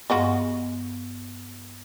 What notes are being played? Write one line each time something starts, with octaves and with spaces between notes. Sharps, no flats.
G2 G#3 B3 F4 F#4